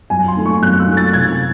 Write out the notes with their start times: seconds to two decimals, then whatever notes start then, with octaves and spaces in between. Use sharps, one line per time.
0.10 F#2 G#5
0.28 C6
0.37 D#3 A3
0.46 C#6
0.62 F#2 F#6
0.79 E6
0.88 D#3 A3
0.97 A6
1.13 C3 G#6